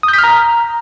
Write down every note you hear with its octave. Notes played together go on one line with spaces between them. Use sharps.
D#6
G6
B6
F6
A#5